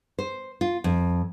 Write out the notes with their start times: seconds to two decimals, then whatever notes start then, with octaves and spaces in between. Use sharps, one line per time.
0.18 C5
0.61 F4
0.84 F2